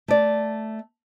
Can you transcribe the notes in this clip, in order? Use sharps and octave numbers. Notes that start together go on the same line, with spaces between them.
A3 D5